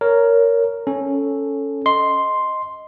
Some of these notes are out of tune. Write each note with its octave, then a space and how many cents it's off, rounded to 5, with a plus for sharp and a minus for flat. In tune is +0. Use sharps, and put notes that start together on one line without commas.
A#4 -5 C#5 +15
C#4 +0 A4 +0
D#5 +0 C6 +0